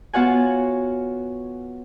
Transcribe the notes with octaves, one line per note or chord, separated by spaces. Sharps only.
B3 F4 F#4 C#5 F#5 G#5